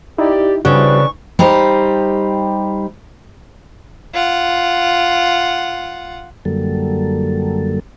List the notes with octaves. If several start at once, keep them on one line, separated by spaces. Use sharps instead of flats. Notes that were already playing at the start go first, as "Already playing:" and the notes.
D#4 E4 G4 D5
C#3 E3 G3 C4 D4 F#4 B4 C#6
G3 D#4 G4 C5
F4 F#5
F#2 D3 F#3 G3 A#3 A4